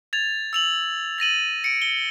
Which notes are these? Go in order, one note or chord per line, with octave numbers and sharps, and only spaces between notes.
G#6 A6 F7
E6 F7 F#7
A6 A#6 D#7 F#7
C#7 D7
G7